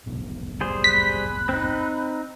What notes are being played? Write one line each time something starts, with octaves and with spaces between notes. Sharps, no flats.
F1 B1 B2
G3 G#4 C5
B5 F#6 B6
C4 D#4